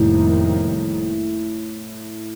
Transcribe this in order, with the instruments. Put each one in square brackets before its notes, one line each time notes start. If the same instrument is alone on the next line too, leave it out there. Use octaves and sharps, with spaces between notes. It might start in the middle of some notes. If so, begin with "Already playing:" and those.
Already playing: [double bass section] F1 F2 D#3 G3 A#3 [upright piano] A2